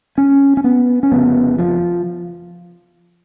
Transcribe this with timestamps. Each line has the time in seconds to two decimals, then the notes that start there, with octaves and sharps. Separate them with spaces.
0.18 C#4
0.57 C#4
0.64 B3
1.03 C#4
1.12 F1 F2 C#3 B3
1.59 F3